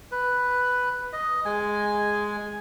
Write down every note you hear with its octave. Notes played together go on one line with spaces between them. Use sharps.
B4
D#5
G#3 G#5